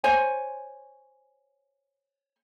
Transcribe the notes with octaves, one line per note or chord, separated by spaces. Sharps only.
C5 C#5 G#5